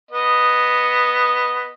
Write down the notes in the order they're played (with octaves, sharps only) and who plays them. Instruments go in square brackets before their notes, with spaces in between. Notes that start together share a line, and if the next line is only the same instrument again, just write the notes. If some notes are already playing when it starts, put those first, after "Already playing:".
[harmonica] B3 D#5